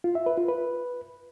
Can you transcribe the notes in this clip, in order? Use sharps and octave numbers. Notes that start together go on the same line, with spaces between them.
F4
E5
B4
F4
B4